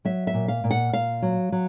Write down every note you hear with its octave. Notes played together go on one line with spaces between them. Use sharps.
F#3 E5
E5
A#2
F5
A#2
F#5
A#2 F5
F#3
F#3